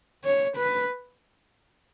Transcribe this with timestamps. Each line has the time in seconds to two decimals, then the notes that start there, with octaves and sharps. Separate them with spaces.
0.24 C#5
0.57 B4